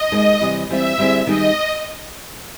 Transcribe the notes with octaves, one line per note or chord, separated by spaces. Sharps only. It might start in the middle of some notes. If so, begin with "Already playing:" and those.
Already playing: D#5
D#2 D#3 G#3
C3 E3 G3
E3 G3 C4 F4 E5
D3 G3 C4 E4 G#4
D#3 G3 B3 D#4 G#4 D#5